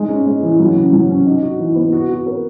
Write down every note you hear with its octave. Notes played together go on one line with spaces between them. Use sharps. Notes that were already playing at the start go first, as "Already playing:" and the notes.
Already playing: G#3 D#4
C#4
G#3
E3
F#3
C#3
F#3
C#4
D#4
F#4
E3
B3
F#4
F#4
A#4